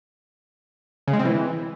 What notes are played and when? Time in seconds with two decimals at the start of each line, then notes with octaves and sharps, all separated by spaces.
1.08 C#3
1.13 G#3
1.19 C4
1.25 E3